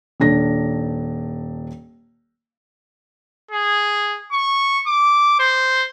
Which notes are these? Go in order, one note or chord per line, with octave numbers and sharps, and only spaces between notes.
D#1 D4 A#6
G#4
C#6
D6
C5